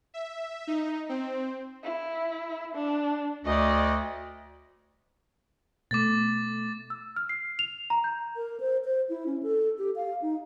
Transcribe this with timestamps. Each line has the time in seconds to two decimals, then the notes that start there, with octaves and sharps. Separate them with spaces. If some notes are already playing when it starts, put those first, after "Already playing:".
0.14 E5
0.67 D#4
1.09 C4
1.84 E4
2.75 D4
3.45 D2 D5 D#5
5.91 B2 A3 D6 A6
6.90 E6
7.16 F6
7.29 C7
7.59 F7
7.90 A#5
8.04 G6
8.36 A#4
8.60 C5
8.85 C5
9.09 E4
9.26 C#4
9.43 A4
9.79 G4
9.96 F5
10.22 D#4